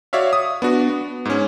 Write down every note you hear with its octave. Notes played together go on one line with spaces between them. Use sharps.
F#4 C#5 D5 E5 F5
D#6
B3 D4 F#4
B3
G#2 C#4